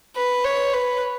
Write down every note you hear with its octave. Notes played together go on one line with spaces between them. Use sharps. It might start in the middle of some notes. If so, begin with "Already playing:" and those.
B4
C#5
B4